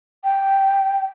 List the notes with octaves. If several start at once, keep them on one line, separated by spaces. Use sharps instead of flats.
G5